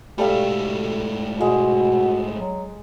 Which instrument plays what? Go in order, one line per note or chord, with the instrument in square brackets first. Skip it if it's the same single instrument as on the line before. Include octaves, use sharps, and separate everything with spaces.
[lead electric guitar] G#2 A3 [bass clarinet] B2 [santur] G3 A4 F5
[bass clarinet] B2 [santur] G#3 [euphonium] F#4
[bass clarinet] F#3